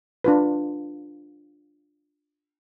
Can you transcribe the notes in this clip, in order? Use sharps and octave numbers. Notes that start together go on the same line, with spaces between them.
D4 F4 B4